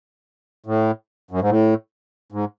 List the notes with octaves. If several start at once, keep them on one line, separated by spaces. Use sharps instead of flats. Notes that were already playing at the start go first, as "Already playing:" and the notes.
A2
F#2
G#2
A2
G#2